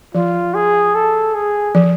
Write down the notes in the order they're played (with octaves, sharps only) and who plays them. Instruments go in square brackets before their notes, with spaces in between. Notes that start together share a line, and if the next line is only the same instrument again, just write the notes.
[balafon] F3 [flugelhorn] F4
[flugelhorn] G#4
A4
G#4
[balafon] F3